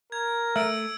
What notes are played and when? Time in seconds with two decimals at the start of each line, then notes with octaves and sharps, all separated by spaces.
0.12 A#4 G#6
0.56 A3 E5 E6 D7